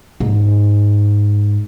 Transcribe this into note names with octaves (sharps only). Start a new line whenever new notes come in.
G#2